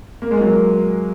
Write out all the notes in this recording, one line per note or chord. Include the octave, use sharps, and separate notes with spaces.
A#3
G#3
F#3 A#3